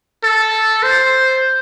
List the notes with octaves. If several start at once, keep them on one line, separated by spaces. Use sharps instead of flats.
A4
C5